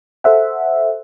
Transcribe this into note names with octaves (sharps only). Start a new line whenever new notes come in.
A4 C5 E5 F#5